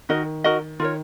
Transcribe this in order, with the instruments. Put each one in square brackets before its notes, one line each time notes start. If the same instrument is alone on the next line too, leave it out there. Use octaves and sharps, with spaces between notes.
[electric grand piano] D#3 [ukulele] D#4 F#4 A#4 D#5
[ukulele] D#4 F#4 A#4 D#5
[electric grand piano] D#3 [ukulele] F4 A#4 C#5